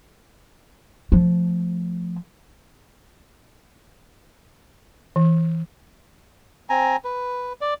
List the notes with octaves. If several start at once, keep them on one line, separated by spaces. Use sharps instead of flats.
F3 A3
E3
C4 G#5 A#5
B4
D5